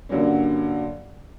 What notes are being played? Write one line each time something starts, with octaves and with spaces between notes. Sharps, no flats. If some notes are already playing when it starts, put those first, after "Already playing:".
G2 D3 F#3 A#3 C#4